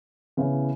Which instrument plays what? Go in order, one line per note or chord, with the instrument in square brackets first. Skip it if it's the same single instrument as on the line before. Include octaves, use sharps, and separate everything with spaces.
[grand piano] C#3 E3 B3 E4